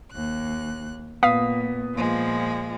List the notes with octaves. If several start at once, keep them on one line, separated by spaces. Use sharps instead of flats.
D#2 F#6
A#2 B3 F5 D#6 B6
A#2 F3 G#3